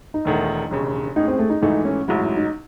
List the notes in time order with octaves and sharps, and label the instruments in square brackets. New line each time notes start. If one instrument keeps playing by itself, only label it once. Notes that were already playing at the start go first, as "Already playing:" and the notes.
[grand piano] D#4
[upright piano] E1 E2 D#3 A3
E1 D#2 C#3
[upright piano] A2 G#3 C#4 G#4 [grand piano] D#4
[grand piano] C4
A3
D#4
[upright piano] G#1 G#2 E3 A3 [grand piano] D#4
[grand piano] C#4
[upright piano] A1 G#2 F#3 [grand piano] E4
[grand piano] E4
D#4